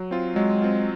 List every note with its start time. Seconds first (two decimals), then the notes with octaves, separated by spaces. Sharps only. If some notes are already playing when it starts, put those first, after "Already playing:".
Already playing: F#3
0.11 C4 F4
0.36 F#3 G#3
0.62 C4 F4